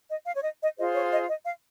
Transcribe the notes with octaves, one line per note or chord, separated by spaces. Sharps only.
D#5
F5
C#5
D#5
D#5
F4 G#4 C5 D#5
C#5
D#5
D#5
F5